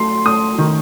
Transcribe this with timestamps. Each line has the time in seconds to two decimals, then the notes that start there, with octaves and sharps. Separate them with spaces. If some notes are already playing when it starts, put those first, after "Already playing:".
Already playing: F#3 A3 C6
0.25 A3 D#6
0.58 D#3